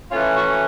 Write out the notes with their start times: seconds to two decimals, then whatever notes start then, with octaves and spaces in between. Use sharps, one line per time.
0.11 E3 A3 C#4 F4
0.36 F#4